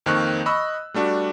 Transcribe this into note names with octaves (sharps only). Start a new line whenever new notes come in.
F2 D#3 A#3 C4 C#6 F#6
D#5 B5 C#6 E6
G3 A3 D4 F#4